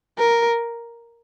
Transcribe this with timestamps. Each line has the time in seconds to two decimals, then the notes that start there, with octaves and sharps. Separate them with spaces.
0.18 A#4